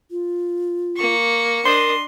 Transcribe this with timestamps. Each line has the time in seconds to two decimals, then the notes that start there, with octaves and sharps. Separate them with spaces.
0.11 F4
0.97 A#3 C#6
1.65 D4 A#4 D#5 C6